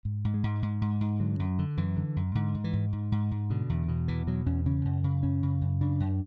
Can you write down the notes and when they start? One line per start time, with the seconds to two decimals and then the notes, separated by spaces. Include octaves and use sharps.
0.05 G#2
0.25 G#2
0.34 G#3
0.44 G#2
0.62 G#2
0.81 G#2
1.01 G#2
1.20 D3 F#3
1.39 F#2
1.59 D3
1.77 F#2 E3
1.97 D3
2.16 F#2
2.35 G#2 D3
2.55 G#2
2.64 E3
2.73 G#2
2.93 G#2
3.12 G#2
3.31 G#2
3.50 B2 D3
3.70 E2
3.88 B2
4.08 E2 E3
4.27 B2 F#3
4.46 E2 C#4
4.66 C#3 C#4
4.85 F#2
5.04 C#3
5.23 F#2 C#4
5.43 C#3
5.61 F#2
5.81 C#3 D4
6.00 F#2